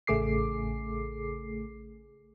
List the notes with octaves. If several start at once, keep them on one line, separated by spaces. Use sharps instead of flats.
A1 C#3 A3 G#4 D6 C7